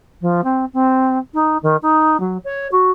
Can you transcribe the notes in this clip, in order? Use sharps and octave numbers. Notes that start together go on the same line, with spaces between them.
F3
C4
C4
D#4
D#3
D#4
F#3
C#5
F#4